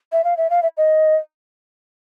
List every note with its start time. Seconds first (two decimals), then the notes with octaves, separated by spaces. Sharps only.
0.12 E5
0.24 F5
0.37 E5
0.50 F5
0.63 E5
0.77 D#5